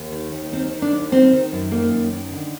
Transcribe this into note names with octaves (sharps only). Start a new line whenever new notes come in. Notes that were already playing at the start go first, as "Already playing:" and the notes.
Already playing: D#2
D#3
D#2
D#3 C4
D#3
D4
D#2
D#3 C4
D#3
F#2
D#3 A#3
F#2
D#3
D3